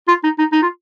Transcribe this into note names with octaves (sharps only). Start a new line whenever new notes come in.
F4
D#4
D#4
D#4
F4